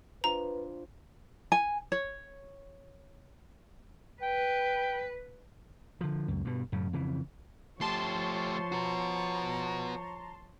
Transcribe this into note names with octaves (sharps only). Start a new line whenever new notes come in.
D4 F4 B4 C5 A#5
G#5
C#5
B4 G5
D3 F3
C#2 F#2
G2 B2
F#2 A2 C#3
F2 C#3 E3
F3 A3 G4 C#5 A5 C6
F#4 B4 A#5